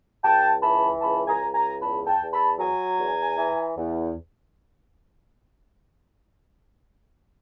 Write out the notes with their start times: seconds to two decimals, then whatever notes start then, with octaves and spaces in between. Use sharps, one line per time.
0.23 C#2 G5 A5
0.62 E3 A5 B5
1.01 C#2 A5 B5
1.27 G#5 A#5
1.41 C#2
1.53 G#5 A#5
1.80 E2 A5 B5
2.07 G5 A5
2.19 E2
2.32 A5 B5
2.59 F#3 G#5 A#5
2.98 E2
3.37 E3
3.76 E2